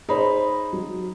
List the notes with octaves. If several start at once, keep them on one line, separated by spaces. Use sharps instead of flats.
D#4 G#4 C5 C#5 B5
F#3